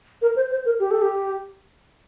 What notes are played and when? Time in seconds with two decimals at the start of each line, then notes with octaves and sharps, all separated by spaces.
0.22 A#4
0.36 C5
0.51 C5
0.66 A#4
0.80 G4
0.91 A4
1.02 G4